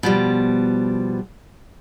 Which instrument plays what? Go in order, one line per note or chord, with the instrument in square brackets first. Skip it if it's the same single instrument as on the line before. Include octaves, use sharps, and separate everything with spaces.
[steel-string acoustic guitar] B2 F3 G3